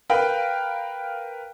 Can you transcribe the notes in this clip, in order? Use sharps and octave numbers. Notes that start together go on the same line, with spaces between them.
A#4 B4 F5 G5